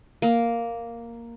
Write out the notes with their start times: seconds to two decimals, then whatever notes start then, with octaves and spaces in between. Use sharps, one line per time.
0.22 A#3